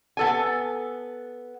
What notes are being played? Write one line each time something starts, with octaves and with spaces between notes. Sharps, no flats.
B3 A4 G#5